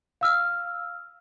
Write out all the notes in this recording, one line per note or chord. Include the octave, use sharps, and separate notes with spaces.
F5 E6 F6